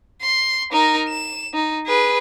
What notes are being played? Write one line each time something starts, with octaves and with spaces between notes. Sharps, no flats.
C6
D#4 A#4
E7
D#4
G#4 B4